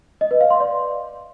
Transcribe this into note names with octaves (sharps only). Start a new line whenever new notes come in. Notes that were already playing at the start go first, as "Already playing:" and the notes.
D#5
B4
F5
C6
D5